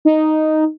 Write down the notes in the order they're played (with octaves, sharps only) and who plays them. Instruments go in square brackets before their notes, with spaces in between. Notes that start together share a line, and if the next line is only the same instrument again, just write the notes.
[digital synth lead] D#4